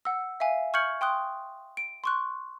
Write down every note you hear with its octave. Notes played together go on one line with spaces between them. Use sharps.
F#5 E6
E5 F5 G#5
C#6 F6 G6 G#6 C#7 F#7
G5 C6 D#6 F#6
D7
C6 C#6 F#6